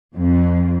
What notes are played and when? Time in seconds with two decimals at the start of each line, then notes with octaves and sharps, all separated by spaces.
0.15 F2